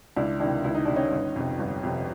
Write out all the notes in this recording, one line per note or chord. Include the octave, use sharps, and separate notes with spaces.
C#2 D4 E4
C3 D#3 D4 E4
C#2 E4
D#4
C3 D#3 D4
C#4 D#4
G1
F2 C3
G1
F2 C3